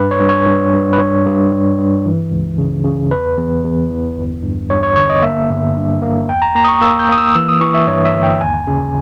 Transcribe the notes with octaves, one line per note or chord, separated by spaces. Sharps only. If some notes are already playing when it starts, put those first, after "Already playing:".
Already playing: G2 B4
C#5
G2
C#5
G2
G2
B4
G2 C#5
G2
G2
G2
E3
C#2
C#3
C#3
E2 B4
E2
E2
E3
G1
G2
G2 C#5
C#5
G1 C#5
D#5
A#3 E5
G1
G2
A#3
E2 G5
A#5
A#3 A#5
D#6
C#6
A#3 E6
G6
A#3 D#6
E6
E3 E6
D#6
E3 C#6
E5
G2 C#5
E5
G1
G5
D#2 G#5
C#3